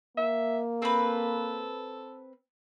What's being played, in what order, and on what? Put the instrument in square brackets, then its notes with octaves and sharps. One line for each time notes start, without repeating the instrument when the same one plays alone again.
[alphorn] A#3 [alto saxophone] E5
[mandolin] C4 B4 [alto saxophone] A4